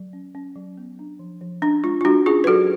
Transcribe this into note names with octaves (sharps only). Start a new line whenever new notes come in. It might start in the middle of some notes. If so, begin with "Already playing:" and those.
Already playing: F#3
C#4
C#4
F#3
B3
D4
F3
F3
C#4 D4
G#3 F4
F4
G#3 D4 F#4
C#4 F4 G#4
B4
F#3 F#4 A4